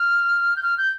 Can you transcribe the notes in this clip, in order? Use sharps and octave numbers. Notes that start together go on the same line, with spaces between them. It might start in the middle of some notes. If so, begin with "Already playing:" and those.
Already playing: F6
G6
F6
G6